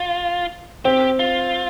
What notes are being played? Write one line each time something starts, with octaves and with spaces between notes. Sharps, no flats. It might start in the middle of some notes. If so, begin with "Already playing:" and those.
Already playing: F4
C4 G4
F4